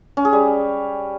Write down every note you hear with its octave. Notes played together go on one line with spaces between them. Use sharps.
C#4
G#4
G3